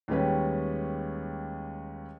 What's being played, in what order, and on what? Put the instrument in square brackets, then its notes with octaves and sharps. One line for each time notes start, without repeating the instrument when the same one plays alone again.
[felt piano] D#2 G3 G#3 C#4 B4 G5